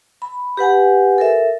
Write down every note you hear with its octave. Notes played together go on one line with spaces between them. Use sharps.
B5
G4 B4 F#5 G#5
A4 A#4 E5